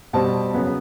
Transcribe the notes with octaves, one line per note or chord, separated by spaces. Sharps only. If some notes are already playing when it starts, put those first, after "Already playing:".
B2 G3 C4 A5
C#3 F#3 B3